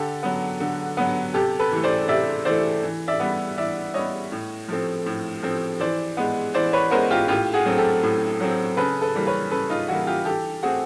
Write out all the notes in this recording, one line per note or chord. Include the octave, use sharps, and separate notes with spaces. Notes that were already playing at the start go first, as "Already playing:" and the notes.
Already playing: D3 G4 A4
F#3 B3
D3
F#3 B3
C3 G4 A4
A4 B4
E3 A3
C5 D5
C3 D5 E5
E3 A3 C5 D5
E3
D5 E5
G3 B3
E3 D5 E5
G3 B3 C#5 D#5
A2
F3 A3 C4
A2
F3 A3 C4
E3 C5 D5
G#3 B3
E3 C5 D5
B4 C#5
G#3 B3 A#4 C5
F4 G4
A2 F4 G4
F#4 G#4
F#3 A3 C4
G4 A4
A2
F#3 A3 C4
C#3 A4 B4
A4 B4
E3 G3 A#3
B4 C#5
C#3 A4 B4
D#4 F4
E3 G3 A#3 E4 F#4
F4 G4
E3 G4 A4
A3 C4 F#4 G#4